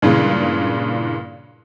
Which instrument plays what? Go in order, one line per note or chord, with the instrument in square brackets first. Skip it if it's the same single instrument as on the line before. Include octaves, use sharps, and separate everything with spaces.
[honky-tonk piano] G2 A#2 C#3 E3 G#3